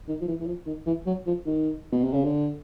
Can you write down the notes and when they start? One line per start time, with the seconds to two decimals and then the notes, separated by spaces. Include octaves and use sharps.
0.08 D#3
0.21 F3
0.28 E3
0.40 E3
0.46 F3
0.66 D#3
0.86 E3
1.06 F#3
1.26 F3
1.46 D#3
1.92 B2
2.03 C3
2.14 C#3
2.24 D3